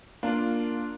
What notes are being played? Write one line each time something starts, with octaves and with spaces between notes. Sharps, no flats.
A#3 D4 F4